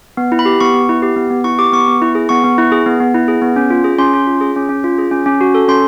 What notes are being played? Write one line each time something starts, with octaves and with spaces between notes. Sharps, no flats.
B3
E4
B5
G4
B3 C#6
B3
E4
G4
B3
B3
E4 C#6
G4 D6
B3 C#6
B3
E4
G#4
B3 C#6
B3
E4
G#4
B3
B3
E4
G#4
B3
C#4
F4
G#4
C#4 C6
C#4
F4
G#4
C#4
C#4
F4
G#4
C#4
C#4
F#4
A4
C#4 C6